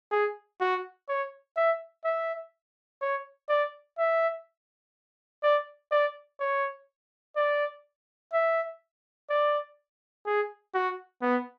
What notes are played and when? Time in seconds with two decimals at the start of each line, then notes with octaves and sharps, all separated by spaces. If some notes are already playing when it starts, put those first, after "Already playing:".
0.11 G#4
0.60 F#4
1.09 C#5
1.57 E5
2.04 E5
3.01 C#5
3.49 D5
3.98 E5
5.43 D5
5.91 D5
6.40 C#5
7.36 D5
8.33 E5
9.29 D5
10.26 G#4
10.74 F#4
11.22 B3